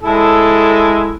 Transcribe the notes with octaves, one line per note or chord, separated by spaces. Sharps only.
G#3 E4 A4